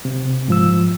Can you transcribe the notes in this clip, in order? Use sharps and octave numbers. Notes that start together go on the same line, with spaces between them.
C3
G#2 F3 E6